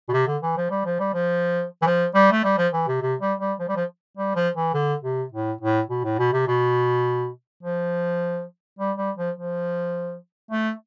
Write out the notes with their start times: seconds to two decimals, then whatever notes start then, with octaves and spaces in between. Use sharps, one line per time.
0.08 B2
0.13 C3
0.27 D3
0.42 E3
0.57 F3
0.70 G3
0.85 F3
0.99 G3
1.14 F3
1.82 E3
1.86 F3
2.15 G3
2.32 A3
2.44 G3
2.58 F3
2.73 E3
2.88 C3
3.01 C3
3.20 G3
3.40 G3
3.59 F3
3.68 G3
3.76 F3
4.17 G3
4.35 F3
4.56 E3
4.74 D3
5.04 C3
5.32 A2
5.61 A2
5.90 B2
6.04 A2
6.19 B2
6.33 C3
6.47 B2
7.63 F3
8.79 G3
8.97 G3
9.17 F3
9.36 F3
10.51 A3